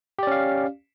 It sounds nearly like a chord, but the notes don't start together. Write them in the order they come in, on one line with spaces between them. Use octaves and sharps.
G4 D5 C#4 F5